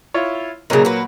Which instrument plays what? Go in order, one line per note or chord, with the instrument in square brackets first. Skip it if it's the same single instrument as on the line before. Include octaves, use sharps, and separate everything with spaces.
[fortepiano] E4 F4 C#5
[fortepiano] A#2 F#3 A#3 [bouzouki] C#3 D#4
[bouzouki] F#4 B4